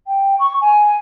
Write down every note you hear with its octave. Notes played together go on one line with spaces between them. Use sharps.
G5
C#6
G#5